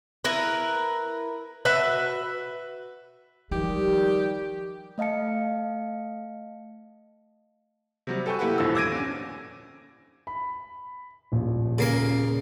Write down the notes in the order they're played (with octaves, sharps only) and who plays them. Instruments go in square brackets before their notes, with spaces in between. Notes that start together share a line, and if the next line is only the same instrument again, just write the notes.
[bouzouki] E4 A#4 B4
F#4 B4 E5
[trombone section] D#3 G3 [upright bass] F3 G#3 [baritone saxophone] G4
[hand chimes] A3 D#5 F5 A5 C#7
[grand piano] C3 F#3 G3
A4 B4 G5 G#5 C#6 G6
A3 A#3 E4 G4 B4 F#5
D#1 A1 D#2 D3 F3 E6
D6 E6 G#6 A#6 D7 D#7
C#4 D4
B5
D#1 A#1
[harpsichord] C#3 A#3 A#4